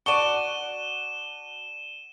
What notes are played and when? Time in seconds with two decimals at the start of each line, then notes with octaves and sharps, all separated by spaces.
0.06 F#4 D5 A5 C#6 D#7 E7 G7